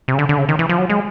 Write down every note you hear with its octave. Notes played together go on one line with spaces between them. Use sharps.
C3
C#3
D3
D3
C#3
D#3
E3
F3
F#3
G#3